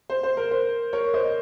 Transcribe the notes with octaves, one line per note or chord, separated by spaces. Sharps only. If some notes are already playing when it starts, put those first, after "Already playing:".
C5
C5
A#4
C5
A#4 C#5
C5 D#5